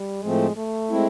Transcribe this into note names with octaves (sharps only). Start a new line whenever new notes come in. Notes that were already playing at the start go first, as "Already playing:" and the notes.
Already playing: G3
A2 F3 G#3 A3 C4
A3
G#3 C4 E4